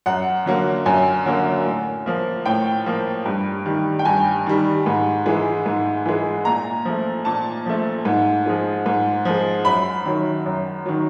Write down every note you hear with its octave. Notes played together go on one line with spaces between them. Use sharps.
F#2 F#5
D3 F#3 A#3
F#2 G#5
D3 F#3 A#3
A2
F3 A#3
A2 G5
F3 A#3
G2
D#3 G3
G5
G2 G#5
D#3 G3
G#2
E3 G#3
G#2
E3 G#3
A#2 A#5
F3 A3
A#2 A5
F3 A3
G#2
F3 G#3
G#2
F3 G#3
F#2 B5
D#3 F#3
F#2
D#3 F#3